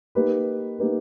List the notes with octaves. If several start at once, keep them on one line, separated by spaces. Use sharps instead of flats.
A#3 D#4 G4 B4
A#3 D#4 G4 B4